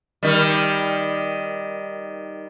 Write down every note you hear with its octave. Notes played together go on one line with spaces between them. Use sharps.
D#3 G3